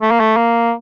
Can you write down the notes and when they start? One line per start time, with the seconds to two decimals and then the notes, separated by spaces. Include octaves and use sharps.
0.02 A3
0.11 A#3
0.20 A3
0.37 A#3